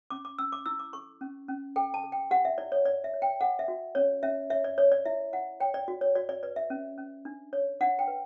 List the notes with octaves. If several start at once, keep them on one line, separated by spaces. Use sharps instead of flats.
C#4 D6
D6
C#4 E6
D6
E4 E6
D6
A4 C#6
C#4
C#4
A4 G5
A5
A4
G5
G4 F#5
E5
E4 D5
C#5
C#5 D5
E5
C#5
G5
A4 F#5
E5
F#4
C#4 C#5
C#4 E5
C#5 E5
D5
C#5
D5
E4 E5
E4 F#5
C#5 G5
D5
F#4
C#5
F#4 D5
D5
B4 D5
E5
C#4
C#4
D4
C#5
D4 F#5
G5
B4